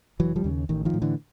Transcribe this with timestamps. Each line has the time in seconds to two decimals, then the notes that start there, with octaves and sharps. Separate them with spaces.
0.19 F1 E3 F#3
0.36 F3 G3
0.44 D#2 C#3
0.69 A1 D#3
0.85 D#3 F3
0.94 A2
1.02 D3 E3